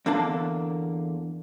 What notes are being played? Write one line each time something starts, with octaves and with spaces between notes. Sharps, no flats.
E2 D3 A#3 D4 A5